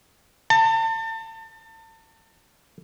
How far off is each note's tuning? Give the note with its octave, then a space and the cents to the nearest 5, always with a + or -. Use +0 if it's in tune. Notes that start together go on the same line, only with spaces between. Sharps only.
A5 +35